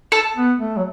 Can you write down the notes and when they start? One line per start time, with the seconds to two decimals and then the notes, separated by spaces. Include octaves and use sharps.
0.12 A4
0.36 B3
0.58 A3
0.77 F#3